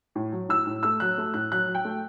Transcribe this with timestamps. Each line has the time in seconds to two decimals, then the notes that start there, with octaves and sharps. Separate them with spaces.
0.15 A2
0.32 F#3
0.49 A2 E6
0.66 A2
0.83 A3 E6
1.00 F#3 F#6
1.18 A3
1.34 A2 F#6
1.52 F#3 F#6
1.68 F#3
1.75 G5
1.85 A3